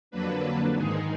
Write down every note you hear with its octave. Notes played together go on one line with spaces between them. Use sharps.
F2 D3 F#3 A#3 D4 B4
G#2 D#3 G#3 D#4 G#4